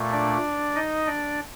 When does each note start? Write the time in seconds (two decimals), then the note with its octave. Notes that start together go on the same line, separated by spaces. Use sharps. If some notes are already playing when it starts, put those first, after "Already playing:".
Already playing: A#2 A3
0.12 D4 D5
0.76 D#4 D#5
1.07 D4 D5